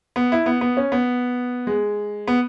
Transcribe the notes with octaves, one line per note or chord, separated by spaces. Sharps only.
B3
E4
B3
B3
C#4
B3
G#3
B3